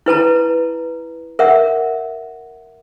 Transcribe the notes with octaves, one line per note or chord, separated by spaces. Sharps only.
E4 B4 A5 A#5
A#4 E5 F#5